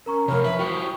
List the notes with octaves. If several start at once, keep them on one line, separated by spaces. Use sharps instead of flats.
C#4 A#4 A#5 C#6
C3 F3 A#4 C#5 B5
B4 E5
F4 F#4 C5 G5 C#6